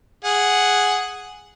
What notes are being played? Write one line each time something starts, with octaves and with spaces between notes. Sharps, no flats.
G#4 F#5